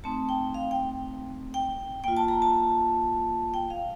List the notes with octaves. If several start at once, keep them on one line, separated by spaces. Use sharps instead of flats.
A3 C4 D#4 A5
G5
F5
G5
G5
A#3 F4 G5
A5
A#5
A5
G5
F5